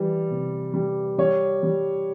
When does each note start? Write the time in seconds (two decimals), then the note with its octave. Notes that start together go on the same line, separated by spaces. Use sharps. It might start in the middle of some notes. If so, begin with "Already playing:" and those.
Already playing: E3 G3
0.30 C3
0.74 G3
1.18 G3 C#5
1.63 G3